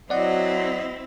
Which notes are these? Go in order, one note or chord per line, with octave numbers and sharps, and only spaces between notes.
F#3 C4 E4 D5 D#5 F#5